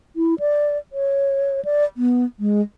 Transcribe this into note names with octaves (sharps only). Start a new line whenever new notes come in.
E4
D5
C#5
D5
B3
G#3